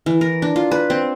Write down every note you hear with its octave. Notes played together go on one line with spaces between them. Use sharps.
E3
A#4
D4
F4
B4
C4